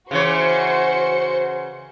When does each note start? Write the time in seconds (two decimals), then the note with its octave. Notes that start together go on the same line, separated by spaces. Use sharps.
0.11 C#3 E3 F#4 C5 C#5 C#7